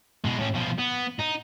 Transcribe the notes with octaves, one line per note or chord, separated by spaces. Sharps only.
B2 G#3
A2 C#4
B2 F3
B3
D#4